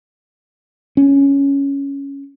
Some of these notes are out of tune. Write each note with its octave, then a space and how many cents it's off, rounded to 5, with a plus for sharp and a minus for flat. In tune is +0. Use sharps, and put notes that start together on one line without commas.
C#4 +5